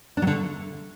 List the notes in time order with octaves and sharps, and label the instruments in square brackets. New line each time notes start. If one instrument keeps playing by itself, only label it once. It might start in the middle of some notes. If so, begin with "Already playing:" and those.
[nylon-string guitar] D4
F#3
D3
A3